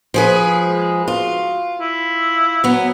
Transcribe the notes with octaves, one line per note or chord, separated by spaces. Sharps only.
F3 G#4 B4
G#3
F4 F#4
E4
F#3 B3